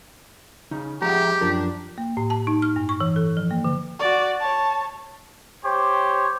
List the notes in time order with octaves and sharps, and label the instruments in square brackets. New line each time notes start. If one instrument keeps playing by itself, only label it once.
[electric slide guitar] C#3 [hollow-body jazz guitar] D#4
[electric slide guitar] F3 G#3 G#4 [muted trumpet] G4 [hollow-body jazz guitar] F#5 A#5
[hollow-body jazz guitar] F#2 F3 A#4 [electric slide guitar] D4
[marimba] A#3
A2
A5
D#4
F6
G2
C#6
E3
A4
F3
A#3
D3
[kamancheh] F#4 D5
C#5 A5
[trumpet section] G4 C5 C#5